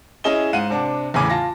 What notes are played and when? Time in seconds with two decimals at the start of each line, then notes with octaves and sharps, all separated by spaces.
0.24 C#4 E4 G#4 D#5 E7 G7
0.53 G#2 F5 F#5 D#7
0.70 C3 D4
1.14 E2 A2 C#3 G#5 D6
1.30 F4 A5 A#6